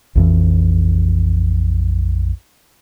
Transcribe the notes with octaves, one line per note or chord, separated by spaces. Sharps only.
A#1 F2 E3